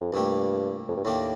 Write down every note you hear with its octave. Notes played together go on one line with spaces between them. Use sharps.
F2
C2 G2 A#2 A3 D4 G4
F2
G2
D#2 A2 D#3 A#3 D4 G4